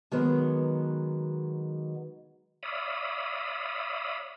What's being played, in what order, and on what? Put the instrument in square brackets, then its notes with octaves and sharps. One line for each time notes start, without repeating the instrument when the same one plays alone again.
[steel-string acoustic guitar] D#3 F#3 G#3 B3
[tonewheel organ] C#5 D5 E5 F5 B5 D#6